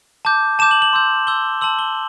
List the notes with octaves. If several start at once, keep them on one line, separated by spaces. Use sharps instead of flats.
A5 D6 G6
A5 D6 G6 E7
F#7
F#7
C6 E6 G6
C6 E6 G6 G7
A5 C6 E6 F#7
G7